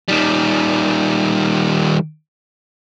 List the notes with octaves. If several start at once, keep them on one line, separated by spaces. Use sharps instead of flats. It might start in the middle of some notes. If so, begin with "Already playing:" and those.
D#3 G3